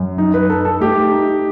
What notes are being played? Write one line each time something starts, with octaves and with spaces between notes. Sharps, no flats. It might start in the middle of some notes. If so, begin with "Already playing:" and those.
Already playing: F#2
D#4
B4
D#4 A4
A4
A3 G4
D#4